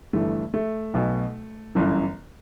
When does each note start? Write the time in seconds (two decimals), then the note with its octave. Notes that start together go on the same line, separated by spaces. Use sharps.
0.13 G1 G2 E3 A3
0.54 A3
0.94 B1 B2
1.75 G1 F#2 E3